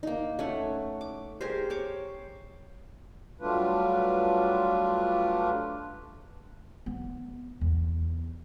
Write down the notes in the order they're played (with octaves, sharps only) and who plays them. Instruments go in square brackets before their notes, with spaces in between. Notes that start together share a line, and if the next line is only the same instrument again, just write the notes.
[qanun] A#3 D#4
A3 C#4 F#5
D6
G4 G#4 A#4 C5
C5 C#5 D6
[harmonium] F#3 G3 A3 D4 F4 B4
[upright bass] B3
E2